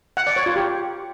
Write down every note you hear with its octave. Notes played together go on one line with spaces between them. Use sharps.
F#5
D5
C#5
F4
G4